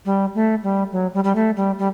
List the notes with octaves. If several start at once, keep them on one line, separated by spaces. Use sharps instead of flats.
G3
A3
G3
F#3
G3
G3
A3
G3
G3